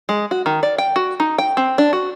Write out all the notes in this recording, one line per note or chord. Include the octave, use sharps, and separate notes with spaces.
G#3
F#4
D#3
D5
G5
F#4
D#4
G5
C4
D4
F#4